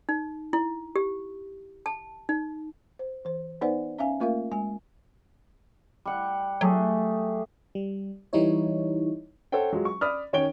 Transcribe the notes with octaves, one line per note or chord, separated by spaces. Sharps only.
D#4
E4
G4
A5
D#4
C5
E3 C5
B3 D#4 B4 C5 D5 F#5
C#4 E5 F5 G#5
A3 A#3 F4 A#4 E5 F5
G#3 G#5
G3 F#5
F#3 A3 G4 G#4
G3
E3 G3 D#4 E4 C#5
A4 C5 C#5 F#5 G5
F#3 G#3 F4
C#6
D5 B5 D#6 F6
D#3 C#4 C#5 G5 D7 G7